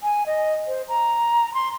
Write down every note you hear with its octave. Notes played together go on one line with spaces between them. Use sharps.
G#5
D#5
C5
A#5
C6